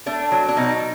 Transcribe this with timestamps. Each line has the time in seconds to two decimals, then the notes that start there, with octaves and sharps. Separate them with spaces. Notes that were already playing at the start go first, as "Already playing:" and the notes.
0.06 A3 D4
0.32 F#3
0.48 D4
0.57 B2 D#4